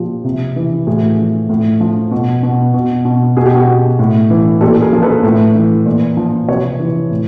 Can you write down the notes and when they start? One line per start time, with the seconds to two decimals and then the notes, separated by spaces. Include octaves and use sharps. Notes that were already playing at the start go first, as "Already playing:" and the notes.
Already playing: A#2 F3 F4 G4
0.24 C3
0.56 E3
0.87 A2 F#4 G#4
1.18 F3
1.49 A2
1.80 F3
2.11 B2
2.43 B2
2.74 B2
3.05 B2
3.36 B2 G#4
3.46 G4
3.54 F#4 G#4
3.68 B2
3.99 A2
4.30 E3
4.61 A#2 G4 A4
4.81 G#4 A#4
4.93 F3
5.02 A4 B4
5.23 A2
5.55 E3
5.86 A#2
6.17 F3
6.48 C3 B4 C#5
6.80 E3
7.11 A2